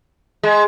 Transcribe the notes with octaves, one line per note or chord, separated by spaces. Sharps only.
G#3